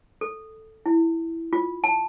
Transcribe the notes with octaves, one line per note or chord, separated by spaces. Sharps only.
A4
E4
F4
A5